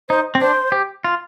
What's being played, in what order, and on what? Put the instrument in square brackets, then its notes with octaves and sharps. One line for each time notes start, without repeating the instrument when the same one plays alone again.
[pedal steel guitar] D#4 [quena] C5
[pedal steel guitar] C4
[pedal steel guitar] D4 [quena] C5
[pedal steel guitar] G4
F4